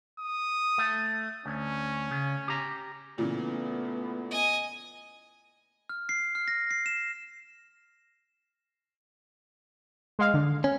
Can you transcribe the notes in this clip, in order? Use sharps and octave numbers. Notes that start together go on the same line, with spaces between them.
D#6
A3
D2 C#4
C#3
G4 A#5
A#2 C#3 E3 A3 B3
D#5 G#5
F6
C7
F6
A#6
C7
E7
G#3 F5
D3
C#4